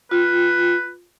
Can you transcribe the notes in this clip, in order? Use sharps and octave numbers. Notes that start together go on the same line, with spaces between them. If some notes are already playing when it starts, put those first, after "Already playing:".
F4 B4